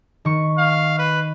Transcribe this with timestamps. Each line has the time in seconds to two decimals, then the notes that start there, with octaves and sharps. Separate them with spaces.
0.25 D#3 C#6
0.58 F5
0.98 B4